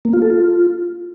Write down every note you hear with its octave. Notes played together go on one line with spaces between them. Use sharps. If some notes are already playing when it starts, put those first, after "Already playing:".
A#3
F4
A4
F4